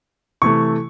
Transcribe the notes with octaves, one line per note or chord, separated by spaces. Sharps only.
C3 E3 A3 C#6